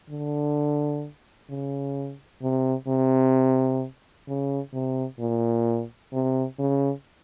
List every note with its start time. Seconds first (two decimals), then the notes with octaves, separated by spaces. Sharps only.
0.10 D3
1.49 C#3
2.42 C3
2.88 C3
4.28 C#3
4.73 C3
5.19 A#2
6.13 C3
6.59 C#3